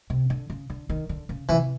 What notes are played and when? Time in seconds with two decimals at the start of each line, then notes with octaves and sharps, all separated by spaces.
0.10 C3
0.30 D3
0.50 C#3
0.70 D3
0.90 D#3
1.09 D3
1.29 C#3
1.49 C3 E3